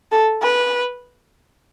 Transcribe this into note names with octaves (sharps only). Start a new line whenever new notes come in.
A4
B4